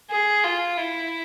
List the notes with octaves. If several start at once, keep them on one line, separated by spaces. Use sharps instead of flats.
G#4
F4
E4